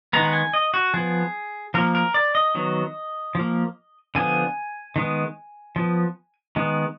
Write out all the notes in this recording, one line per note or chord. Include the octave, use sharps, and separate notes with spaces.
D#3 G#3 B3 A#5
F#5
G#5
D#5
F#4
F3 B3 G#4
F3 A#3 A#4
A#4
D5
D#5
D#3 F#3 B3
F3 A#3
D3 F3 B3 G#5
D#3 G#3 B3
F3 B3
D#3 G#3 B3